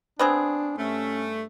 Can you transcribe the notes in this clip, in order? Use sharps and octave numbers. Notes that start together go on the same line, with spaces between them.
B3 C4 D4 G#4
G2 A3 C#4